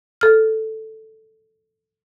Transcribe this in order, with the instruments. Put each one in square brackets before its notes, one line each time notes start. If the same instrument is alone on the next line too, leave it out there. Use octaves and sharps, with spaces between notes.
[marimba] A4 F6